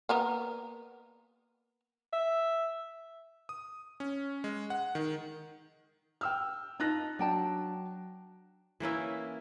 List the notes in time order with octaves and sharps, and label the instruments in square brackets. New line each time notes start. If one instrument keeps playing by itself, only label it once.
[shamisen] A#3 B3 A#4
[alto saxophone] E5
[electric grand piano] D#6
C#4
G#3
F#5
D#3
[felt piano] G5 E6 F6
[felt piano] D#4 F#6 A#6 [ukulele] F4 D#5 A5
[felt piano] F#3 [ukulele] D4 G5 A5
[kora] E3 A#3 C#4 E4